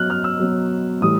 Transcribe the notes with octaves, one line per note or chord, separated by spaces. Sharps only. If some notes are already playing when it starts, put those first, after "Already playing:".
Already playing: B2 F#3 F6 F#6
F6
E6
B2 F#3
A2 E3 G3 D#6